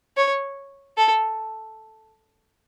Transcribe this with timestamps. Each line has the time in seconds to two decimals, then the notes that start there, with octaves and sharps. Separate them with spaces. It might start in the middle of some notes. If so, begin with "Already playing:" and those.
0.17 C#5
0.98 A4